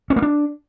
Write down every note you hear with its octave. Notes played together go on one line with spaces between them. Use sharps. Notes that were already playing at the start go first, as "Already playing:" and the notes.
C#4
A#3
D4